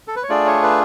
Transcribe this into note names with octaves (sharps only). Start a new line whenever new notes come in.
A4
B4
C#5
A3 D4 F4 G#4 D5
C#5
B4